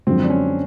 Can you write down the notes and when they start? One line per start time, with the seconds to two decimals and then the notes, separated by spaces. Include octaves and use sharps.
0.07 F#2 D3 F3 G#3 C4
0.24 D4
0.30 C#4